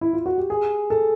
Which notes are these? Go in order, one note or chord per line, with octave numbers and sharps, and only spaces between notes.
E4
F4
F#4
G4
G#4
A4